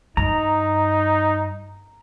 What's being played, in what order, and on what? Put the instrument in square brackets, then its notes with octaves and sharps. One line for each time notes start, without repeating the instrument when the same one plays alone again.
[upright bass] G2 [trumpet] D#4 [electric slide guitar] A#5